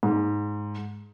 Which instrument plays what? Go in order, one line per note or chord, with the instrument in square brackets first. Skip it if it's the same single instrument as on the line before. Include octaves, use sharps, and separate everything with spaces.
[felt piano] G#2